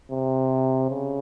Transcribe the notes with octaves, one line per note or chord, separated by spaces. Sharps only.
C3
C#3